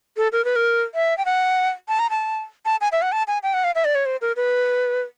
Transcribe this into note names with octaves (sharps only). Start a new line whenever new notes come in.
A4
A#4
B4
A#4
E5
G5
F#5
A5
A#5
A5
A5
G#5
E5
F#5
A5
G#5
G5
F#5
F5
E5
D5
C#5
C5
A#4
B4